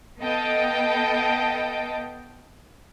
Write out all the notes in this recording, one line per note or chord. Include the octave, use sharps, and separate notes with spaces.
B3 A4 D#5 F5 G5 A5